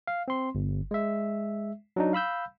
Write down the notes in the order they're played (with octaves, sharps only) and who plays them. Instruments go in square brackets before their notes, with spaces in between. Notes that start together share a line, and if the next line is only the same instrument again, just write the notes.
[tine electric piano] F5
C4 C6
G1
G#3 E5
F#3 D4 D#4
F5 B5 E6 G6